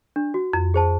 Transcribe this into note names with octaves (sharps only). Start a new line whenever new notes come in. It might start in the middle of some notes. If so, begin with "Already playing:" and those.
D4
F#4
F2
G#4 C5 A5